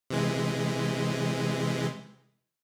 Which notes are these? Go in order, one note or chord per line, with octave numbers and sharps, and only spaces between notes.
C3 E3 G#3